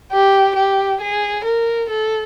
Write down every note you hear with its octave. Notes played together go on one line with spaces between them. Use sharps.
G4
G4
G#4
A#4
A4